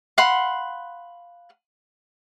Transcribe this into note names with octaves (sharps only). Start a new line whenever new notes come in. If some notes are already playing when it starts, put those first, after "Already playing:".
F5 F#5 B5 C6